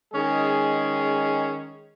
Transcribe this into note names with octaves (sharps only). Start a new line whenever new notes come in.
D#3 G#3 C#4 G#4